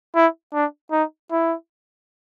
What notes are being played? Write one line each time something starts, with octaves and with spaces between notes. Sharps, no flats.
E4
D4
D#4
E4